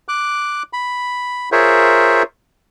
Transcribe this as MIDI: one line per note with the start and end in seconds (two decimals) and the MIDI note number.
0.09 0.63 86
0.09 0.63 90
0.73 1.49 83
1.52 2.23 65
1.52 2.23 68
1.52 2.23 70
1.52 2.23 72
1.52 2.23 73
1.52 2.23 76